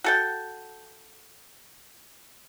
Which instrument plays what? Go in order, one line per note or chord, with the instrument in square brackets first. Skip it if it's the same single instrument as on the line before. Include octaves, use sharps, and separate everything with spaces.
[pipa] F#4 A4 G5